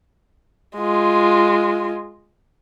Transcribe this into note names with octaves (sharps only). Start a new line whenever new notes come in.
G#3 F4